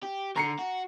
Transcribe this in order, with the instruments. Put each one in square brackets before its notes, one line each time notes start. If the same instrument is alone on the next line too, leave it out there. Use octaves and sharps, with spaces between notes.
[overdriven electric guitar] G4
[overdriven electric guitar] D3 [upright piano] A#5 C7 C#7
[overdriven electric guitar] F#4